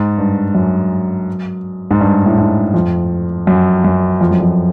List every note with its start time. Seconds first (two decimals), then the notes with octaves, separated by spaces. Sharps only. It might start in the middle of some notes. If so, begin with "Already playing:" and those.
Already playing: G#2
0.18 G2
0.55 F#2
1.91 G#2
2.01 G2
2.26 A2
2.38 G#2
2.74 F2
3.47 F#2
3.84 F#2
4.21 F2
4.31 F#2
4.41 F2